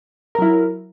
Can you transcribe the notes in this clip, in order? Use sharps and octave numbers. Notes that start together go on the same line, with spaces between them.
F#3 E4 A#4